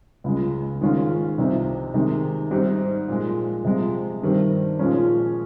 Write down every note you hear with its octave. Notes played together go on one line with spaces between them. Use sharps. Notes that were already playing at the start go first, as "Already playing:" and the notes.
C#2 C#3 G#3
G#2 D#3 G#3 C#4 F4
C2 C3 F3 C4 D#4
C3 D#3 G#3 D#4
G#2 G3 C4 D#4
A#2 F3 G#3
C3 F3 G#3
G2 D#3 G3 C4
A#2 F3 G#3 C#4